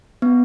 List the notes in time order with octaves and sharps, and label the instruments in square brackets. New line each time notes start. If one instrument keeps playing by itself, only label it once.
[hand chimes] B3